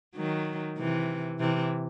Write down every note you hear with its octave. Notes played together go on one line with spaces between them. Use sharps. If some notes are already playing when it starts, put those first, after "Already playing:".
D#3 F#3
C3 E3
C3 E3